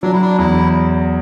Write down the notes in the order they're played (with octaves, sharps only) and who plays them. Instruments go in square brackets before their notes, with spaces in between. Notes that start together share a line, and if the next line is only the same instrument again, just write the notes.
[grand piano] F#3 [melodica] D4
[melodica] E4
D4
[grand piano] E2 [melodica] E4